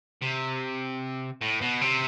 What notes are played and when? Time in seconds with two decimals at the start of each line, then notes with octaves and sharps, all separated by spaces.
0.22 C3
1.42 A2
1.61 B2
1.81 C3